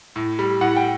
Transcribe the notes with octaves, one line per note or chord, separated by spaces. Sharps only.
A2
G3
A2 F#5
G5